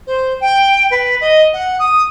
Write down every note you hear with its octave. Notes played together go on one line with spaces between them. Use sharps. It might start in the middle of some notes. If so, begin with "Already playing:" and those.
C5
G5
B4
D#5
F#5
D#6